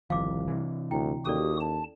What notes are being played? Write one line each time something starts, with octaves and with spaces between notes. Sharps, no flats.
G1 C2 D#3 F3 F5 D6
C3 E3
D2 E4 G5
D#2 C#4 F#4 G4 A4 D5 D#6
A5